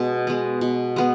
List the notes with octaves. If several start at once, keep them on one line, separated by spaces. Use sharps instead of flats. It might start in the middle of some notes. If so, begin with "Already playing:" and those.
Already playing: B2 G#3 B3
G#3 B3
B2
G#3 B3